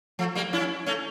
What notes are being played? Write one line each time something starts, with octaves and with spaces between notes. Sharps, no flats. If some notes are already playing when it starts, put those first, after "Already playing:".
F3 A3
G3 A#3
C#4 E4
A3 C#4